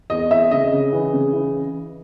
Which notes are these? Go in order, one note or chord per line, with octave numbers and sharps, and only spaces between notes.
E2 D#5
E2 E5
C#3 D#5
C#3
E3
C#3
E3